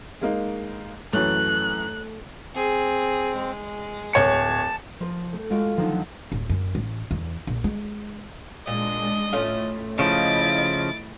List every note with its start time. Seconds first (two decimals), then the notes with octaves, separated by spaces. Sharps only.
0.21 G#3 A#3 D#4
1.13 F#2 E3 A3 C#4 F#6
2.55 C4 G#4
3.35 G#3
4.13 D1 C#5 A5 C#7
5.00 F3 A#4
5.33 A3
5.50 G#3 F4 F#4 F5 D7
5.77 D3 D#3 F3 F#3 D#4
6.32 D1
6.49 F#2
6.75 A1
7.11 E2
7.47 A#1
7.64 G#3
8.67 A#2 G#3 D4 D#5
9.33 A2 A3 C#4 F4
9.99 C#3 F3 E4 D#5 A6 D7